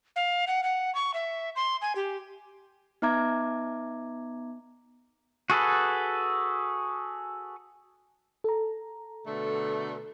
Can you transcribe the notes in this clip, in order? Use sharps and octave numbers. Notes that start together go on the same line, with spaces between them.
F5
F#5
F#5
C#6
E5
C6
G#5
G4
B3 D#4 E5 A#5 D6 G#6
F#4 G#4 A4 B4
A4 A#5
B2 D3 A3